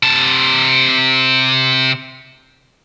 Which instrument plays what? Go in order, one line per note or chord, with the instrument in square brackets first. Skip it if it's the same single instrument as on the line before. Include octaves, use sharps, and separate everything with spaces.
[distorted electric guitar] C3 A5